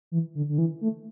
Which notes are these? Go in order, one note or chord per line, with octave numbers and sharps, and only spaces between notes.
E3
D3
D3
E3
A3